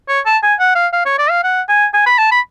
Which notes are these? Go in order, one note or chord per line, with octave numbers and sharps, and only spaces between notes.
C#5
A5
G#5
F#5
F5
F5
C#5
D5
F5
F#5
G#5
G#5
B5
A5
B5